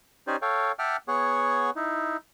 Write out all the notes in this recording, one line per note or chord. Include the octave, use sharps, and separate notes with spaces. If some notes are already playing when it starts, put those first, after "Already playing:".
C#4 D#4 G4 C5 D5 G#5
A4 C#5 F5 G5
E5 F#5 G5 A5 D6 F6
B3 G#4 C#5 F#5 C#6
D#4 E4